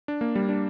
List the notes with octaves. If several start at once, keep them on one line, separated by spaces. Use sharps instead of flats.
D4
A#3
G3
D4